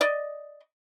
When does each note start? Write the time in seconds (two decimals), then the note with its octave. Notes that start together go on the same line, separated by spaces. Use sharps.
0.01 D5 D#5